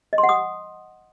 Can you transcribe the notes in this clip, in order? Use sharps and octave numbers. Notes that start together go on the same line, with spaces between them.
D#5
C6
F#5
D#6